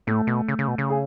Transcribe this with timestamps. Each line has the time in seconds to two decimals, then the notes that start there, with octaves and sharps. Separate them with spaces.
0.07 A2 A3
0.27 B2
0.48 C#3
0.59 C#3
0.68 B2
0.78 C#3
0.89 G#4